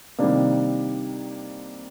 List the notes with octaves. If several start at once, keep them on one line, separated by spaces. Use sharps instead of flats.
C3 D#3 G3 A#3 D4